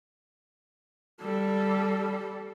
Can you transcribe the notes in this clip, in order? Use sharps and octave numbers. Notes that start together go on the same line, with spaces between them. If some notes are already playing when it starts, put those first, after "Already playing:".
G3 A4